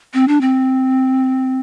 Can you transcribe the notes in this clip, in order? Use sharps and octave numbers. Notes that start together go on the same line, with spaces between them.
C4
D4
C4